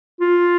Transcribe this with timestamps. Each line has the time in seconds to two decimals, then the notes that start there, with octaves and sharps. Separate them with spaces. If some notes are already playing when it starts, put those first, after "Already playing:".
0.21 F4